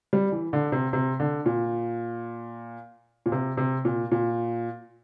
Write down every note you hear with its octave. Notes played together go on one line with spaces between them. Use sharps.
G3
E3
D3
C3
C3
D3
A#2
A#2
C3
C3
A#2
A#2